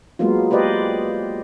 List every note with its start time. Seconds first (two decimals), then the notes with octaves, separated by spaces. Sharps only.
0.19 F#3 G#3 A#3 B3 F4
0.51 G4 B4 C5 D5 D#5